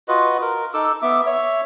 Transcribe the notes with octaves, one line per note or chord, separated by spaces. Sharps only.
F4 F#4 B4 D#5
A#4
D#4 A4 D6 E6
B3 E5 D6
C#5 E5